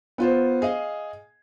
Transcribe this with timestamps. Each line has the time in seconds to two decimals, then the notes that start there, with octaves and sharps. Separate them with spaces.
0.18 B3 F4 C5
0.62 G#4 D#5 F5